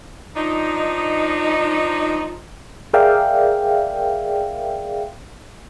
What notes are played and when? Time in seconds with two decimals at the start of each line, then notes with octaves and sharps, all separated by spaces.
0.35 F3 D4 D#4
2.94 G#4 A#4 D5 E5 F5 G5